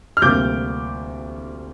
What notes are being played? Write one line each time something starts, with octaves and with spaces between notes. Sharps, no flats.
F6
D2 C3 G3 A#3 D6 G6